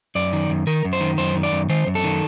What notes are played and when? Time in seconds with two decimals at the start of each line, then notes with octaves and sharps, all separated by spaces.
0.15 F#2 D5
0.33 D#3
0.50 F#2
0.67 D#3 A#4
0.84 F#2
0.93 C5
1.01 D#3
1.18 F#2 C5
1.35 D#3
1.43 D5
1.51 F#2
1.69 D#3 C5
1.86 F#2
1.95 A4
2.04 D#3